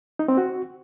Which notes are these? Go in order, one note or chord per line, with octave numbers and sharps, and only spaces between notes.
D#4
C4
F#4